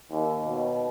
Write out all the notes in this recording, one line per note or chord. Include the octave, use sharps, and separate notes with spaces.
D#2
B2